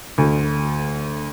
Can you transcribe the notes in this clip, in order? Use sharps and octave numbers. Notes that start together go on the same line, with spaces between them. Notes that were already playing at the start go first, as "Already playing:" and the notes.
D2